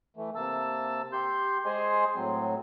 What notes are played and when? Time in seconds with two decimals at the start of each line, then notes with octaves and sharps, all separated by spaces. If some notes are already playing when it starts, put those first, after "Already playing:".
0.16 E3 A3
0.36 C3 A#3 A5 E6
1.13 G4 C6 G6
1.66 G#3 G#4 C5 D#5 G#5 C6
2.15 A2 F#3 C4